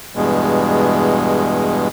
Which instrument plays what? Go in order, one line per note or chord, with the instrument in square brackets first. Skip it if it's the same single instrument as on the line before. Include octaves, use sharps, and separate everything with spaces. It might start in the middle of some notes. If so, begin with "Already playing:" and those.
[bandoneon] E2 G2 B2 G#3